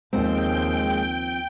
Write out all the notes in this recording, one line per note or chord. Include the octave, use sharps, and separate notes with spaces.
D#2 F3 G#3 C4 G5